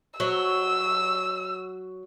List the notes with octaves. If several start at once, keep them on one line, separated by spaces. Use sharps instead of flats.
F#3 E6